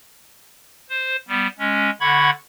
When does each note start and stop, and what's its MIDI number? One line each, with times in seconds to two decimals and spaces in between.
0.89 1.16 72
1.28 1.47 55
1.28 1.47 59
1.59 1.90 56
1.59 1.90 61
2.01 2.30 50
2.01 2.30 78
2.01 2.30 83
2.01 2.30 85
2.01 2.30 92